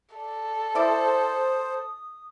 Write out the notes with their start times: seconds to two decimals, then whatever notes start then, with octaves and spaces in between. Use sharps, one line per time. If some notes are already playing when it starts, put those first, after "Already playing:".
0.15 A4 D5
0.75 E4 C5 D5 D#6